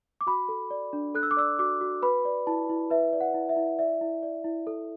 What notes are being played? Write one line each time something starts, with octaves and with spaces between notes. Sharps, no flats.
D6
F#4 B5
A4
D5
D4
A4 F#6
E6
D6
D5 E6
F#4 D6
F#4
B4 B5
D5
E4 A5
E4
B4 E5
D5
F#5
E4
E5
E4
D5 E5
E4
D5
E4
A4